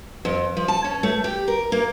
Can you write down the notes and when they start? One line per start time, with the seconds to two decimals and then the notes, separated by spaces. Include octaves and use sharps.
0.25 F2
0.57 F3
0.68 A5
0.84 C#4
1.03 A3
1.24 G4
1.48 A#4
1.72 A#3